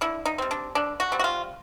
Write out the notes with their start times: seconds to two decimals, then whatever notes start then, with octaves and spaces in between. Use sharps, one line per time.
0.01 D3 E4
0.25 D#4
0.38 G3 C4
0.51 D4
0.75 D3 D4
1.00 F#4
1.12 G3 C4
1.19 F#4
1.24 F4